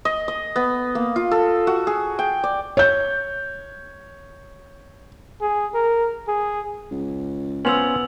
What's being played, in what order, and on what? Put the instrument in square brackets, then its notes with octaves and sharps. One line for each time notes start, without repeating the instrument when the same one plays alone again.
[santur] D#5
D#5
B3
A#3
F4
A4
F#4
G#4
G5
D5
[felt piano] C#5 G6
[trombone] G#4
A#4
G#4
[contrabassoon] C#2
[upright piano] B3 [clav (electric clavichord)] C#4 F4 C5 [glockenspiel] E6 F7 F#7